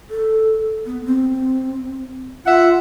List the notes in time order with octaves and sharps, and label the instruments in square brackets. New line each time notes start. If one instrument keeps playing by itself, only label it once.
[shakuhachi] A4
B3
C4
[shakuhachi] F4 [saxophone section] E5 F#5